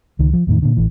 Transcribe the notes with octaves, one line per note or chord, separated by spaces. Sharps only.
C#2 D#3
F3
E2 A2 D#3
A#2 D3
A1 E3